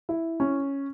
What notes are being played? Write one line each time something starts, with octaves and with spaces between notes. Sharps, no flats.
E4
C#4